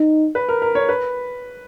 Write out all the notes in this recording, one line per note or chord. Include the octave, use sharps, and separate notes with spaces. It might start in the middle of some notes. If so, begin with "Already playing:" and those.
Already playing: D#4
B4
A#4
A#4
C#5
B4